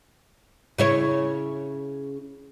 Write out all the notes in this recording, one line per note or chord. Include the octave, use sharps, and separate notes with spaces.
C#3 E4 C#5